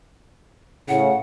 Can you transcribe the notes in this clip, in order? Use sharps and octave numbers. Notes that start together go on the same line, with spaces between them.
A2 C#3 F#5